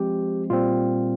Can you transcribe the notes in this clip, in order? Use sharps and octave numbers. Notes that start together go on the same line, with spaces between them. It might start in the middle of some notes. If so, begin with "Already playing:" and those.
Already playing: F3 G#3 C4 G4
A#2 G3 C4 F4